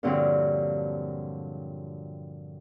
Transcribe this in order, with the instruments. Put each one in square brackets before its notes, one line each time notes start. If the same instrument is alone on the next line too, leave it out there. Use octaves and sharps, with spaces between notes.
[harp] G2 A#2 D3 F3 F#3 C4